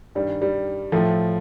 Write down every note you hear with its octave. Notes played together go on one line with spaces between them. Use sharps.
G2 D#3 G3
G3
A2 F3 A3